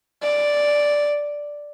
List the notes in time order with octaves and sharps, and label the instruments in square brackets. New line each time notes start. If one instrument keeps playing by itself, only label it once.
[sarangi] D5